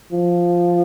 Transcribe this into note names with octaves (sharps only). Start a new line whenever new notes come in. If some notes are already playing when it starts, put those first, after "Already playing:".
F3